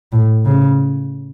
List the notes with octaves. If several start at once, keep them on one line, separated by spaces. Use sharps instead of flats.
A2
C#3